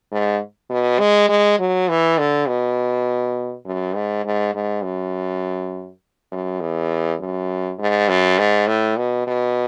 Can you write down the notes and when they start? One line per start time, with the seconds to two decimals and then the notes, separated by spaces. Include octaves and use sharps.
0.12 G#2
0.70 B2
0.99 G#3
1.29 G#3
1.59 F#3
1.89 E3
2.18 D3
2.48 B2
3.66 F#2
3.95 G#2
4.25 G#2
4.54 G#2
4.83 F#2
6.32 F#2
6.61 E2
7.19 F#2
7.79 G#2
8.09 F#2
8.38 G#2
8.67 A2
8.97 B2
9.27 B2